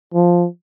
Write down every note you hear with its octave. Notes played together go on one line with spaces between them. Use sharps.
F3